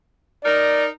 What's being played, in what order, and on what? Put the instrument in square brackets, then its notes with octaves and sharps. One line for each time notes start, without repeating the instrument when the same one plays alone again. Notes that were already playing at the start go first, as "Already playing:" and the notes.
[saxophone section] D#4 A#4 [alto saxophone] D5